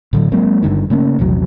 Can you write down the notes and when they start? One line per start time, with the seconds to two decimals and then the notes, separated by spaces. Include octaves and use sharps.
0.13 A2 D3 F#3
0.32 F#3 G#3 A#3 C4
0.63 G1 G2 D3 D#3
0.90 C#3 A3 A#3 C#4
1.19 A#1 E2 C3 F#3